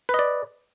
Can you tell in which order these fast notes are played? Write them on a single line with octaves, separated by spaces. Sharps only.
B4 D#5 D5